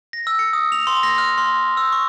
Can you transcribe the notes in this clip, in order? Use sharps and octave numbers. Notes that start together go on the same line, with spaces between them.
A#6
E6
C#7
D#6
F7
C6
A#6
F6
C6
E6
C#6